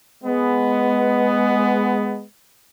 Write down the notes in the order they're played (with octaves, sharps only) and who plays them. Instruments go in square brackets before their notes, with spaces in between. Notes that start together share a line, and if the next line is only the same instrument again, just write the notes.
[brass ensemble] G#3 B3